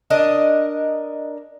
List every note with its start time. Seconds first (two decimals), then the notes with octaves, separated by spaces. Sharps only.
0.10 D4 A#4 D#5